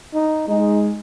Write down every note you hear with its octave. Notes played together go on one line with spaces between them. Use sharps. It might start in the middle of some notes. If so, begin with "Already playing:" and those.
D#4
G#3 D#4